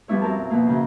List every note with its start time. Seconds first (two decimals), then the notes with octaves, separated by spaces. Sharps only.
0.08 F3 G3 B3 E4 C#5
0.21 F#2 C4 A#4 A5
0.37 B2
0.50 B2 F3 A#3
0.67 F#2 C#3